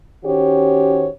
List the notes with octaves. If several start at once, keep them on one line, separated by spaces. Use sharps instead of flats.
D#3 C#4 F#4 G4 C5 C#5